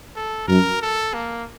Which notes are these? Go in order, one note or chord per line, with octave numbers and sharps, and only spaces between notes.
A4
F#2 A#4
A4
A#3